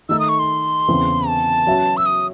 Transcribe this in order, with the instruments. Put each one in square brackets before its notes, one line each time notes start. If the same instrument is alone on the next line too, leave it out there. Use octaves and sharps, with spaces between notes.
[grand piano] D#3 A3 D#4 A4 [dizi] E6
[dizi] D#6
C#6
C6
[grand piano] E2 C#3 E3 C4
[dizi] A5
[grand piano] F#3 C#4 F#4 C#5 E5
[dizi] E6
D#6